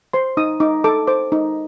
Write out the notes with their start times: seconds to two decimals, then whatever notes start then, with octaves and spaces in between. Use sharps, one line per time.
0.13 C5 C6
0.37 D#4 D#6
0.60 D#4 D6
0.84 A4 D6
1.07 C5 D6
1.32 D#4